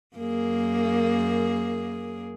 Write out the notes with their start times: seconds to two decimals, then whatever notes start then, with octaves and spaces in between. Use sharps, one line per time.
0.16 F#2 A#3 G#4